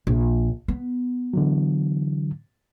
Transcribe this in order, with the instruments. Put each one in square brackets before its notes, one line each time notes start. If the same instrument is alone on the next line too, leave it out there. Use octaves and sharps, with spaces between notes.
[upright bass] A#1
B3
[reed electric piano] D3 E3 F#3